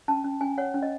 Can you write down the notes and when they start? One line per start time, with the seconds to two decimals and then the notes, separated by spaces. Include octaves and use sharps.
0.08 C#4 A5
0.24 C#4
0.41 C#4 G#5
0.58 C#5 F#5
0.74 C#4
0.82 D#5